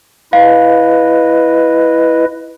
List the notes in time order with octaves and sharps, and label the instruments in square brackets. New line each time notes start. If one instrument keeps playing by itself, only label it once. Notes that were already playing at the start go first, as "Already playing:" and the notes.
[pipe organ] E4 B4 D#5 [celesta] F5